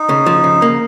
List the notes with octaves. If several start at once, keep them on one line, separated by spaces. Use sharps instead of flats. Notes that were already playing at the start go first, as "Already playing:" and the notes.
Already playing: D#4
C#3
F3
C#3
A#3